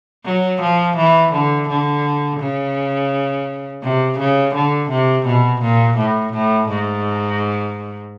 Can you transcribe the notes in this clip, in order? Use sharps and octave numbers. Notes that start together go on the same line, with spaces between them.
F#3
F3
E3
D3
D3
C#3
C3
C#3
D3
C3
B2
A#2
A2
A2
G#2